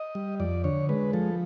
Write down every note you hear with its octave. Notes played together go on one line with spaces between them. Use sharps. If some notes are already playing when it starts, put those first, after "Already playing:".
Already playing: D#5
G3
F2 D5
D3 C#5
G#3 B4
F3 A4